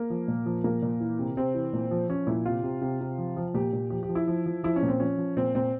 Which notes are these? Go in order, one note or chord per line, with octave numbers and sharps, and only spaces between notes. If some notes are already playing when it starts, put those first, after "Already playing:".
Already playing: A#3
F3
A#2
F3
A#2 A#3
A#2
E3
C3
C3 C4
E3
A#2
F3
F3 C#4
A#2 E4
C3 F4
C3
C3
C3
F3
F3
A#2 G4
A#2
F3 G4
G4
F3
E4
F3
F3
F3 E4
C#4
A#2
C4
F3 C#4
F3
A#2 C4
A#2 C4